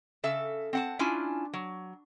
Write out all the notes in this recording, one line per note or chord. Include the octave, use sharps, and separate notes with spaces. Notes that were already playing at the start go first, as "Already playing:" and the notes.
C#3 A4 E5
C4 F#5 A5
C#4 D4 E4 F4 G#5
F#3